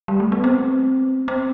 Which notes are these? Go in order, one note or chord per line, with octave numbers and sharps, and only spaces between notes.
G3
A3
B3
C4
C4